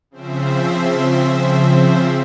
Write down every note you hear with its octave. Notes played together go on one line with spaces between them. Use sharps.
C#3 F3 C4 C5 E5